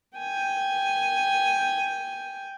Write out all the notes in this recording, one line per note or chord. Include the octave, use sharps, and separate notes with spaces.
G5 G#5